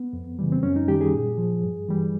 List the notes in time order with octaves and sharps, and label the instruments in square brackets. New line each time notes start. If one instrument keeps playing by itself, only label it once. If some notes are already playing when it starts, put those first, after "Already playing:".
Already playing: [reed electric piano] B3
F2
C#3 E3 G3
C4
F#2 C#4
D#4
D#3 G3 G4
G#4
A#2
F3
G2
E3 G3